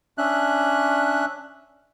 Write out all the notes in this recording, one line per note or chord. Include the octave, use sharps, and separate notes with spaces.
C#4 D4 E5 F#6